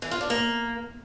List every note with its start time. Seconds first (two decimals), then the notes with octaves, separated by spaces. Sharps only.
0.02 E3
0.11 F4
0.21 D4
0.30 A#3